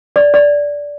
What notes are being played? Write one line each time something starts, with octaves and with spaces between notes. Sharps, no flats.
D5
D5